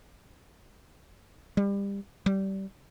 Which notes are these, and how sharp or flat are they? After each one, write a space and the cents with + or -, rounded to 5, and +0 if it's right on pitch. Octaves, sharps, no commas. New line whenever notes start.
G3 +25
G3 -20